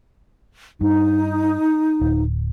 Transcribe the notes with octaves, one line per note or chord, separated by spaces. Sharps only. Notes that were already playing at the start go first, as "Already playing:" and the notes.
G2 D#4
D1